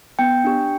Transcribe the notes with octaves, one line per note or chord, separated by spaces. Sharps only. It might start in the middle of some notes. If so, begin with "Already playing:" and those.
B3 G5
D4 G4